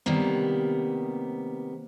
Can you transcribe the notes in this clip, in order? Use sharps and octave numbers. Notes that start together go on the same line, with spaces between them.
C3 D#3 G3 A#3 B3